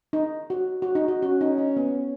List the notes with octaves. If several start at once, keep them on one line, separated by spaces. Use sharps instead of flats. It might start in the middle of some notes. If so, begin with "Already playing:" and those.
D#4
F#4
F#4
D#4
F#4
C#4 F#4
D#4
D#4
B3